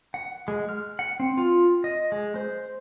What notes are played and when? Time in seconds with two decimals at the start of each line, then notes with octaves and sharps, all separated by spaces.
0.14 F#5
0.48 G#3
0.69 F6
0.99 F#5
1.20 C4
1.37 F4
1.84 D#5
2.12 G#3
2.36 C5